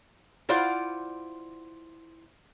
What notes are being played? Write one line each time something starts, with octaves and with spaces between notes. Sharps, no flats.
E4 F4 C5 D5 F5 F#5